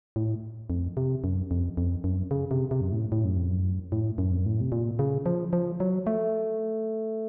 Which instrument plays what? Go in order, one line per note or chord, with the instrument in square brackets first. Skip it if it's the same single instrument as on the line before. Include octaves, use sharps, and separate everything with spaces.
[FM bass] A2
F2
C3
F#2
F2
F2
F#2
C#3
C3
C3
F#2
A2
A2
F#2
F2
F#2
A2
F#2
F2
F#2
A2
C3
A#2
C#3
F3
F3
F#3
A3